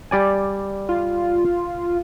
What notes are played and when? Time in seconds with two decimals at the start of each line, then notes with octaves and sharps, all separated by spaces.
0.11 G3 D5 G#5
0.89 F4